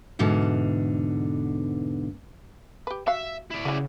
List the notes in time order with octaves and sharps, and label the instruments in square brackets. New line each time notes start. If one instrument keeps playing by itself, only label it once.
[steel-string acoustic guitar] E2 G#2 B2 D3
[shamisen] G4 B4
[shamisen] F#4 F5 [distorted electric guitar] E5
[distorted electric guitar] E4 D5
[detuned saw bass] C#3 [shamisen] E3 F#4